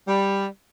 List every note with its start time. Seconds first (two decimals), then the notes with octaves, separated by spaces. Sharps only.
0.08 G3